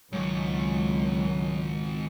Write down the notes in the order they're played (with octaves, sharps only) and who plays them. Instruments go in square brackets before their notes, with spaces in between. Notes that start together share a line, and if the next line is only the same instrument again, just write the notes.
[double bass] C#2 [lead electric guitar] G#2 D#3 [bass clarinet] F#3